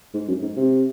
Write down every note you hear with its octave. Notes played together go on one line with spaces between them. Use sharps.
G#2
F#2
G#2
C3